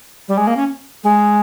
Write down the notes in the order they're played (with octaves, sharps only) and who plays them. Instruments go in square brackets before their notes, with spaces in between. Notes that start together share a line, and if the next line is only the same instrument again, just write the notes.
[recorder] G3
G#3
A#3
C#4
G#3